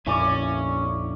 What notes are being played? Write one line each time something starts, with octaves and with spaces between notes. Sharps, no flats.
A#1 F2 A#2 C#4 E4 D5 G#5 C#6